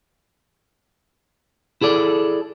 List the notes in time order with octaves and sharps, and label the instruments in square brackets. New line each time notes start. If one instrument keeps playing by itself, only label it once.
[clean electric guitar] E4 G#4 A4 D5